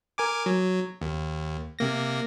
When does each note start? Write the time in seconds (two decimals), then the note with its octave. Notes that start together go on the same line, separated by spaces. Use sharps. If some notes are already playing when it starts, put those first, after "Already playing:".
0.18 A#4 G#5 D6
0.46 F#3
1.02 D#2
1.79 C3 A#3 A#6